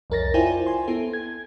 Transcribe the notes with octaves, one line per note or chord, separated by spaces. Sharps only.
C2 F2 A#4 C#5 A6 A#6
E4 F4 C5 D5 G5 G#5
G#5 C6
B3 E4 A4
G#6